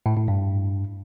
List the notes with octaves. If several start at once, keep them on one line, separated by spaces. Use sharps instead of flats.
A2
A2
G2